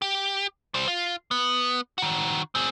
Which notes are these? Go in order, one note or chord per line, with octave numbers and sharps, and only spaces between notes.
G4
G3 C5
F4
B3
D#3 F#4
C4 G#4